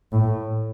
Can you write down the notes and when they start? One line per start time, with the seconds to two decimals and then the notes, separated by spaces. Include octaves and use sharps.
0.12 A2